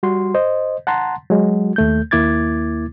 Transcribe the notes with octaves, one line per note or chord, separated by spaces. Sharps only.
G3 F#4 C6
C5 D#5
F#5 A5 A#5 C6
F#3 G#3 F#4
D#2 A3 G6
D#2 A#3 E4 D6 G#6 A6